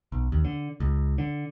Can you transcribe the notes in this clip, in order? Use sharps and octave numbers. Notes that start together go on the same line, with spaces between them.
B1
D#2
D3
C#2
D3